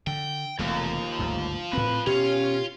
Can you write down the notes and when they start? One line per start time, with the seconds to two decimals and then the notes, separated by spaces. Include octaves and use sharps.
0.07 D3 G5
0.59 E1 D#2 C3 F3 A3
1.19 G1 D2 G#2
1.73 A2 C4 B4
2.07 B2 C#4 F4 G4